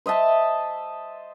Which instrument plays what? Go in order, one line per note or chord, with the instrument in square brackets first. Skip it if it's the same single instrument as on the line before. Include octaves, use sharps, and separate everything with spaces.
[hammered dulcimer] C5 D#5 E5 A5